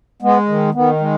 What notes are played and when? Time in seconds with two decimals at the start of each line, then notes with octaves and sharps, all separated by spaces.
0.22 G#3 B3
0.48 D#3
0.74 D#3 B3
1.00 G#3